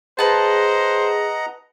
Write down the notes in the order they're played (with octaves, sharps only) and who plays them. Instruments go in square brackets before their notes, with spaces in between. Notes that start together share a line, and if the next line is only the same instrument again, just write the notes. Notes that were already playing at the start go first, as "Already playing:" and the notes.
[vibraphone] G#4 [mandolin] B4 A5 [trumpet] C5 [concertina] D#5 F#5 A#5